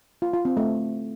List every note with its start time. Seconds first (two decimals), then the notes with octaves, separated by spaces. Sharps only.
0.22 F4
0.34 F4
0.45 C4
0.57 A3